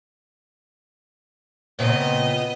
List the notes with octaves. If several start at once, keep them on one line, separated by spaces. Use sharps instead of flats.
A#2 C#3 B3 C4 D#5